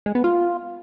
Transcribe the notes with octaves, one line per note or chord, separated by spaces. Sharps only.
G#3
B3
F4